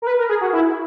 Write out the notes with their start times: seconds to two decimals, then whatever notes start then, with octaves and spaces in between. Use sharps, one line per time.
0.02 A#4
0.07 B4
0.18 A#4
0.29 G#4
0.41 F#4
0.53 E4